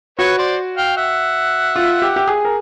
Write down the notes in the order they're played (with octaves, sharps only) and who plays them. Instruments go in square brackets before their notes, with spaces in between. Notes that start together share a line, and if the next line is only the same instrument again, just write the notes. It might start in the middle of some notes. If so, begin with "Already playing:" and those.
[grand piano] F#4 [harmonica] B4 C#5
[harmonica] C5 D5
F5 G5
E5 F#5
[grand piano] F4
G4
G4
G#4
A#4